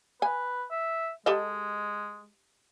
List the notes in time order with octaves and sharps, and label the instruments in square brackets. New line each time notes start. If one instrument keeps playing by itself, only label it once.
[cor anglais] B4 [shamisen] G#5
[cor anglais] E5
[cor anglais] G#3 [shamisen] G4 A4 D#5